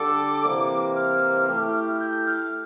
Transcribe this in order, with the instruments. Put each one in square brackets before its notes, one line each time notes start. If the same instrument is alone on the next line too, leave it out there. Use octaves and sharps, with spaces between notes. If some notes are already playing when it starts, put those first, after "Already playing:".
Already playing: [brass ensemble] D3 G3 D4 A4 [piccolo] D6
[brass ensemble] C3 E3 A#3
[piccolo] F6
[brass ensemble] A3 E4 G4
[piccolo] G6
F6